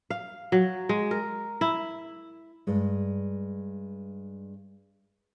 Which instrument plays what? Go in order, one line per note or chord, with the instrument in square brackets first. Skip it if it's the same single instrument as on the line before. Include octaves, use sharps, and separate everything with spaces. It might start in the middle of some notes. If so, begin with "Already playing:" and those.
[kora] F5
F#3
G#3
A#4
E4
[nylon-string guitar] G2 G#3